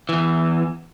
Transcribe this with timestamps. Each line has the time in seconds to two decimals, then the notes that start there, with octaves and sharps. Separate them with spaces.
0.09 E2 E3